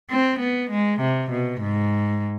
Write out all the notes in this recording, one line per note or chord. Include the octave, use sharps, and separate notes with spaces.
C4
B3
G#3
C3
B2
G#2